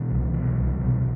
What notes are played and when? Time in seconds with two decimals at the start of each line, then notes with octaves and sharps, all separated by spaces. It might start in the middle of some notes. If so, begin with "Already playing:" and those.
Already playing: B2 E3
0.10 C2
0.34 B2
0.57 C2
0.80 B2